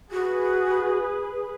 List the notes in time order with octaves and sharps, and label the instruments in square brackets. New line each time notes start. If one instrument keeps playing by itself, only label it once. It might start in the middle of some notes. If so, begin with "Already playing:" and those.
[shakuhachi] F#4 [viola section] G#4 B4